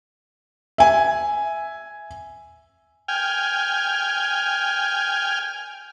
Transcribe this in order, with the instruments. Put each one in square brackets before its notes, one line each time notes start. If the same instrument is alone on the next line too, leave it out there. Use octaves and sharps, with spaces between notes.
[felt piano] E5 G#5
[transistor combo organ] G5 G#5 F6